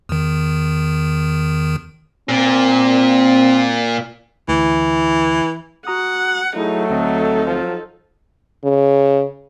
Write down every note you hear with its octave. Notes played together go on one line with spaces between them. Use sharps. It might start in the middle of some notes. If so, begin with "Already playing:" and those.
E2 D#3
A#2 C4
D2 E3
F#4 F#5 A#5 D#6
F#3 A3 D#4 E4 G#4
D2 C4 D#4 A4 D#5
F3
C#3